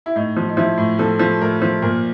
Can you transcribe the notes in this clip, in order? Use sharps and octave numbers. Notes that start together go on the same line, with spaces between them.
E4
A2 D#4
F3
D#4
F3 E4
A2
F3 A4
F3
A2 A#4
F3
A#2 A#4